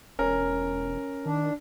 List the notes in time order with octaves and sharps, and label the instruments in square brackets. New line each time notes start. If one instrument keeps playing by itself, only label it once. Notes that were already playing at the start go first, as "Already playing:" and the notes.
[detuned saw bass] E1 [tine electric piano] C#4 [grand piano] A#4
[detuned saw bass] D#3 [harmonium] D4